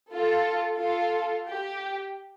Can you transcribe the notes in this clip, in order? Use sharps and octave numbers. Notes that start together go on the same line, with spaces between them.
F4 A4
F4 A4
G4